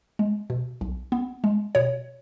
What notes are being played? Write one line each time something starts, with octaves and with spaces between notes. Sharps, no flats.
G#3
B2
B1
B3
G#3
B2 C#5